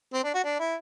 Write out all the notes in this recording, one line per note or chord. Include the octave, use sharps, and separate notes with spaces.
C4
D4
F#4
D4
E4